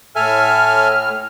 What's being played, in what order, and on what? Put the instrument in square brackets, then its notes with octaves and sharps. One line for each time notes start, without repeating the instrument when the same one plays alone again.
[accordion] A2 F6 [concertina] A4 E5 G#5